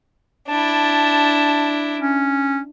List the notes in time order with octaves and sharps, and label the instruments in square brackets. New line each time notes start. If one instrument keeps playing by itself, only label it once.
[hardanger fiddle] D4 E4 [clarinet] A5
[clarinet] C#4